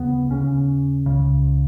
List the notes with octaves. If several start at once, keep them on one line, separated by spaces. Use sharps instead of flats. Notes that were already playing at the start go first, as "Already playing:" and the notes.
Already playing: D#2 C#3 B3
D#2 C#3 C#4
C#2 C#3